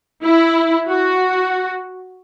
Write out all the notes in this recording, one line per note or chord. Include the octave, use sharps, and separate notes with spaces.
E4
F#4